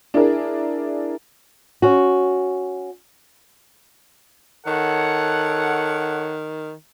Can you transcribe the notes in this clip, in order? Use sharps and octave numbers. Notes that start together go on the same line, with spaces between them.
D4 E4 G#4 A#4
C#4 F#4
D#3 A4 C#5 F#5